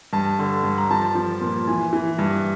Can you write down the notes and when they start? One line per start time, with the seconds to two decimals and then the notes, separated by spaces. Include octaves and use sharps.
0.13 G2 A5
0.39 D3
0.64 G2
0.78 A#5
0.91 F3 A5
1.15 F3
1.41 A#2
1.67 E3 G#5
1.93 E3
2.19 G2